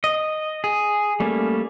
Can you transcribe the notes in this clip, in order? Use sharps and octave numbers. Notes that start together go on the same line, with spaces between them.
D#5
G#4
G3 A3 A#3 C#4